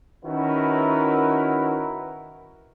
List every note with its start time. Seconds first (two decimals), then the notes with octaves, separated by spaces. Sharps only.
0.25 D#3 C#4 E4 F#4 A#4 B4